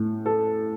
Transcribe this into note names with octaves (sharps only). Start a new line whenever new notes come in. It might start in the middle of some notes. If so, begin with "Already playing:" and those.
Already playing: A2
A4